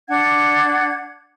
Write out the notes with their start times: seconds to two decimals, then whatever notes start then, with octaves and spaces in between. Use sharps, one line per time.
0.08 D4 F#5 G#6